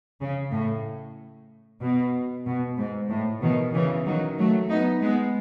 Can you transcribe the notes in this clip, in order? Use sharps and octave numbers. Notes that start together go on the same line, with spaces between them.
C#3
A2
B2
B2
G#2
A2
B2 D#3
C#3 E3
D#3 F#3
F#3 A3
B3 D#4
G#3 B3